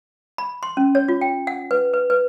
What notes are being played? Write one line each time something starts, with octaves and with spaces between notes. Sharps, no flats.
B5
C6
C#4
C#5
F4
G5
F#5
B4
B4
B4